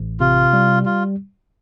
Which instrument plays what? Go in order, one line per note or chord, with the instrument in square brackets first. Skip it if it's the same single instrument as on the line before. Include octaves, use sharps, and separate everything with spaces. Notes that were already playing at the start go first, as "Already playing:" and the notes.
Already playing: [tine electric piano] A1
[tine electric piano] C3 [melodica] F4
[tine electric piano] G3
[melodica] F4